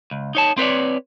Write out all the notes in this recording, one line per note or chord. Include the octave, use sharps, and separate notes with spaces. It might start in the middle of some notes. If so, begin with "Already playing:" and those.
C#2
D#4 C#5 A5
C4 B4 C#5 D5